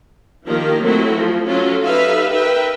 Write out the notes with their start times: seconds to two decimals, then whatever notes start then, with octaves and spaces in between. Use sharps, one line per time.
0.46 D#3 F3 A#3 G4 A#4
0.82 F#3 A3 C4 E4 F#4
1.16 F3
1.47 F#3 C#4 F4 A4
1.83 D#4 G4 A4 B4 E5 F5
2.31 A#4 B4 E5 G5